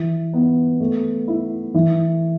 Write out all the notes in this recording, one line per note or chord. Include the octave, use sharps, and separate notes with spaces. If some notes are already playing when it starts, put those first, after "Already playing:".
Already playing: E3
B3
A3
E4
E3